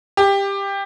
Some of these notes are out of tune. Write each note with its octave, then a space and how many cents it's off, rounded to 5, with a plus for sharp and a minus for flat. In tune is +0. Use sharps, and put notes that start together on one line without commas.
G4 +15